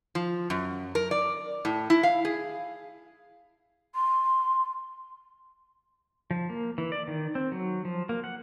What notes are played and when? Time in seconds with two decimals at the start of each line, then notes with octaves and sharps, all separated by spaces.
0.15 F3
0.50 F#2
0.95 A#4
1.11 D5
1.65 A2
1.90 E4
2.03 F5
2.25 G#4
3.95 C6
6.31 F3
6.50 A#3
6.78 E3
6.92 D5
7.08 D#3
7.35 C4
7.52 F#3
7.85 F3
8.09 A#3
8.24 F#5